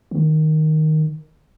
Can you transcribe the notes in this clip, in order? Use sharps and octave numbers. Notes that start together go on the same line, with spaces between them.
D#3